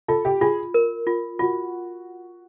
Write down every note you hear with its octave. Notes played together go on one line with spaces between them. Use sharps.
F4 A4
G4
F4 G#4
A#4
F4
F4 F#4